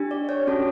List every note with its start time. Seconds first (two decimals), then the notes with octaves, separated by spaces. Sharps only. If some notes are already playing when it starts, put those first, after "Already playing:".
Already playing: D4 G4
0.11 D5
0.29 C#5
0.47 C#4 F#4 A4